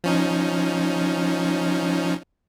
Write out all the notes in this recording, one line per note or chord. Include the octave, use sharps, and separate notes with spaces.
F3 C#4 D#4